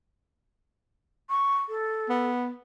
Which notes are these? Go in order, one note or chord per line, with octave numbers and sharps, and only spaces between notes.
C#6
A4
B3